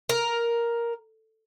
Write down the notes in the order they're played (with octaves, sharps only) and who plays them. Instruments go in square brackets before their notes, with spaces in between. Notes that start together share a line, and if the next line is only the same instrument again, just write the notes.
[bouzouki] A#4